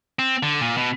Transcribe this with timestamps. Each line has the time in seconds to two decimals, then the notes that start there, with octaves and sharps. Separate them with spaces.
0.19 C4
0.43 D3
0.61 A#2
0.77 B2